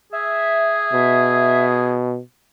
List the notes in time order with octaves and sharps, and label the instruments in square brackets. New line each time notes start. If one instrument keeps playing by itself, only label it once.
[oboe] G#4 [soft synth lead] E5
[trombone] B2